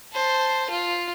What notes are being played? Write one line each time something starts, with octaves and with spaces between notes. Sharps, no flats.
C5 A5
F4